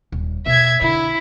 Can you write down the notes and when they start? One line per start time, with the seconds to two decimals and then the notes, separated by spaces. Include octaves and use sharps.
0.12 D#1
0.46 B2 E5 G#6
0.81 D3 E4